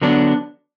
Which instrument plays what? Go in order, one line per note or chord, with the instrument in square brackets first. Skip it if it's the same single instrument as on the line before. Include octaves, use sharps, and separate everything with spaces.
[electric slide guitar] D3 F#3 B3 D4